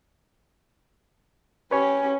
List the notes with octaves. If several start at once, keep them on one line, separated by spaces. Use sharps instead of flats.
C#4 G4 B4 C#5 G#5